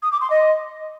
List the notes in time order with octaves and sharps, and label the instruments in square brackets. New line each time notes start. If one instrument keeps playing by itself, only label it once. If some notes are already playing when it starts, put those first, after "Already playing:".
[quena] D#6
D6
C6
D#5